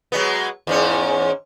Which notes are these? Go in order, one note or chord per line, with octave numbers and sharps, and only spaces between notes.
F#3 G#3 B3
E2 G#2 C#4